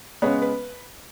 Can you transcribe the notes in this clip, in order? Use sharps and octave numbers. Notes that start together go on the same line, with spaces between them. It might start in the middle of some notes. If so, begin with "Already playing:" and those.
C#3 G#3 B3 C#5
B4